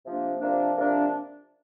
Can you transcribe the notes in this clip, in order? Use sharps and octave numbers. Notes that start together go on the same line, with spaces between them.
C3 F3 A#3 D4
C3 F3 A#3 D4
C3 F3 A#3 D4